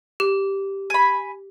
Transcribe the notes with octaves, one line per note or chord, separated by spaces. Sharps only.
G4
G#5 B5